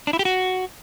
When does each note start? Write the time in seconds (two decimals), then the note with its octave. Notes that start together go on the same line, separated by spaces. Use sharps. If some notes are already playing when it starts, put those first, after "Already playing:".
0.07 D4
0.13 E4
0.19 G4
0.25 F#4